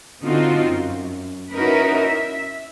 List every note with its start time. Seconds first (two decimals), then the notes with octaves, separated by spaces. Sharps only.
0.22 D3 C4 D#4 F4 F#4
0.62 F#2
1.52 C#4 D#4 E4 F#4 A#4 B4
1.96 E5